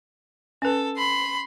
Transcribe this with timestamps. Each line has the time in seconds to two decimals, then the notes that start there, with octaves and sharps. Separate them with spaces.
0.62 C#4 A4 B4
0.96 B5 C6